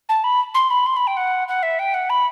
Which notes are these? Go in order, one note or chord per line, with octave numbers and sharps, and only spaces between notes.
A5
B5
C6
B5
C6
B5
G5
F#5
F#5
E5
G5
F#5
B5